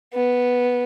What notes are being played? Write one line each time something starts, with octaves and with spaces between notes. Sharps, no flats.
B3